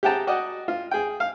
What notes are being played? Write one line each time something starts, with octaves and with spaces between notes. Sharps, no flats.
G4 G#4 F#5 G5 A5 A#5
F#4 D5 D#5 F#5 G5
F4
G#4 G5
F5